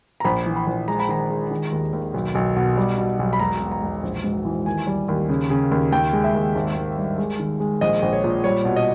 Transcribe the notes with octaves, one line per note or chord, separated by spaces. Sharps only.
A#5
A#1 B5
E3
B5
A#1
G#3 A#5
B5
D#3 A#5
G#3
D#3
D#2
D#2
B1
B1
B2
G3
B2
B1
B5
E1 A#5
B2
A#5
E1
A#1
G#2
E3
D#2 G#5
G3
D#2
C#3
C#3
D#2
D#2 G5
G#3
E5
D#2
G#1
G#1
G2
G#3
D#3
G#3
A#1 D#5
A#1
C#5
A#2
G3 C#5
B2
D#5